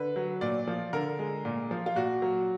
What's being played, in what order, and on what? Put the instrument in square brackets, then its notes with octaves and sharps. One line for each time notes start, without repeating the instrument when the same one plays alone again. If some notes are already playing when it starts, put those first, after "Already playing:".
Already playing: [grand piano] D3 B4
F#3
A#2 D5
F3
D3 A#4
G#3
A#2
F3
F4
A#2 F#4
F#3